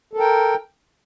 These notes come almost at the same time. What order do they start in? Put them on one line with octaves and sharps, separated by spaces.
A4 A#4 G5